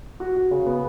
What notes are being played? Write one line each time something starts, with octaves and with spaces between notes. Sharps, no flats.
F#4
F#4
C#3
B3